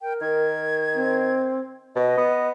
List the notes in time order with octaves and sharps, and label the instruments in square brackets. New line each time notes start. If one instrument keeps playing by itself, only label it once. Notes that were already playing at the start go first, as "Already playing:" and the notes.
[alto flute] A#4 [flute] G5
[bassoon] D#3 [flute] G#6
[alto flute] C4
[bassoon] B2 [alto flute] B4 [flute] D#5
[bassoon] B3